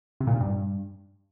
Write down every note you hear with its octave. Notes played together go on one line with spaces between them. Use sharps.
C3
A#2
G#2
G2